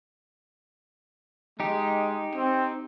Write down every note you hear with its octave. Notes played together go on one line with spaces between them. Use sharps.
G#3 D#4 G4
C4